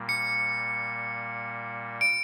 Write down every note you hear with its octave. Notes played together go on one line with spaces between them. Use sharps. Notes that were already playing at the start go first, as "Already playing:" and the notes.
Already playing: A#2 G3 A#3
C#7
D7